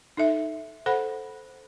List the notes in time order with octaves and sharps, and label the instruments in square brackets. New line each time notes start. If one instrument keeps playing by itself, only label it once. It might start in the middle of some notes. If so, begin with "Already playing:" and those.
[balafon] D#4 A4 E5
A4 C5 F#5 B5